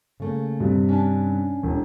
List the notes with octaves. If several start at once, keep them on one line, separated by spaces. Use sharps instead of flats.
C#3 A3 A#3
G2 C3
C#4 D4 A5
E1